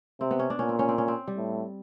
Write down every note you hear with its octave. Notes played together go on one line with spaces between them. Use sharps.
C3 C4
B3
C#4
D4
A#2 C#4
C4
C#4
C4
C#4
C4
G3
A2